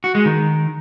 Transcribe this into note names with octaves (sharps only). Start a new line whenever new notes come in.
F#4
G#3
D#3